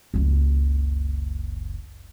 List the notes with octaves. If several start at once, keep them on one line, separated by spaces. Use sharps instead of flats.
F#1 C#2